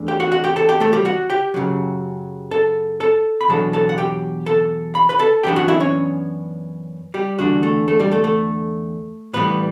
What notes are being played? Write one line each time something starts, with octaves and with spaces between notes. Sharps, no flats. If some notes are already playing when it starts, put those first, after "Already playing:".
Already playing: E2 A3 D4
G4 G5
F#4 F#5
F#4 F#5
G4 G5
A4 A5
G4 G5
A3 A4
G3 G4
F#4 F#5
G4 G5
F#2 C#3 F#3
A4 A5
A4 A5
B5
E2 B2 F#3 B3 D4 A4 A5
A4 A5
F#5
G4 G5
A4 A5
B5
B4 B5
A4 A5
F#2 E3 B3 D4 G4 G5
F#4 F#5
E4 E5
C#4 C#5
G3 G4
E2 D3 G3 D4 F#4
A3 A4
A3 A4
G3 G4
A3 A4
A3 A4
A2 E3 G3 B3 B4